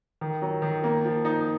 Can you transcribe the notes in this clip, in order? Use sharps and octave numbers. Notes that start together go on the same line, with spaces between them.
D#3
F#3
D#3
A#3
F3
D#4